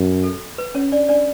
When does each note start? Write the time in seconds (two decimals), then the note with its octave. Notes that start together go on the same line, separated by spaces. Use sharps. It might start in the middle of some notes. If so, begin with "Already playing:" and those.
Already playing: F#2
0.24 A4
0.58 B4
0.75 C#4 C#5
0.92 D4 D5
1.09 D4 D5